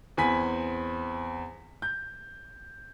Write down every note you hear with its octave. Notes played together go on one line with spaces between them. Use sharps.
E2 C4 G#5 B5 B6
G6